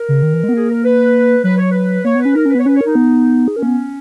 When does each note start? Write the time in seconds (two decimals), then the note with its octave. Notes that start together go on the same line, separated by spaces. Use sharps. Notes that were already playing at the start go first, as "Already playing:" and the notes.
Already playing: A#4
0.09 C#3
0.23 D#3
0.33 E3
0.44 G#3
0.49 B3
0.54 A#3 G#4
0.70 A#4
0.84 B4
1.44 F#3 B4
1.58 C#5
1.71 B4
2.05 A#3 C#5
2.15 B3
2.20 B4
2.25 C#4
2.35 D#4 A#4
2.45 C#4
2.50 B4
2.55 B3
2.59 C#5
2.66 C#4 B4
2.75 C#5
2.81 D#4 A#4
2.95 B3
3.48 G#4
3.56 C#4 A#4
3.63 A#3
3.67 B3